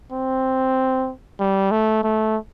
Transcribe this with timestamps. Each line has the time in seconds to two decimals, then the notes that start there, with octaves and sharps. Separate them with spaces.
0.12 C4
1.39 G3
1.71 A3
2.03 A3